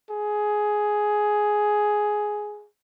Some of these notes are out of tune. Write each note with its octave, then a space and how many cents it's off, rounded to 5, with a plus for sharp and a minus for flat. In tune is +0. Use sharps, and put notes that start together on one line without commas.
G#4 +10